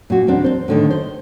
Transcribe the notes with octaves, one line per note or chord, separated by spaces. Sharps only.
A#2 F#4
E2 A#2 C4 D4
C4 C5
A2 D3 D#3
C5